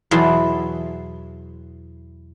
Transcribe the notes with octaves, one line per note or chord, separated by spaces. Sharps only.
E2 B2 F#3 E4 A5 C6